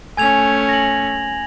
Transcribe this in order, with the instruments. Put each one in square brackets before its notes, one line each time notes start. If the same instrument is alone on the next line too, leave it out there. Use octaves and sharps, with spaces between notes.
[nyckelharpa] A3 C#4 [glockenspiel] G#5 G#6 F7
[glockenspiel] A#6 F#7